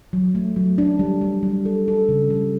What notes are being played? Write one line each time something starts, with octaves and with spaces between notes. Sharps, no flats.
F#3
A3
F#3
D4
G3
G3
G3
A4
A4
C#3
G3